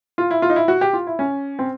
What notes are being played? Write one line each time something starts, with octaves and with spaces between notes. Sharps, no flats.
F4
E4
F4
D#4
E4
F#4
G4
F4
E4
C#4
C4